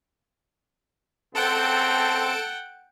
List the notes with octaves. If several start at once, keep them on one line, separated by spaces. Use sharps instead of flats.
C#2 C4 A4 F#5 G5 A5 D7